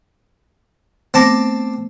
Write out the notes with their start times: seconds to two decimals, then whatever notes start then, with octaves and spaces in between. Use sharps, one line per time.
1.14 A3 B3 C4 A5 D6 A#6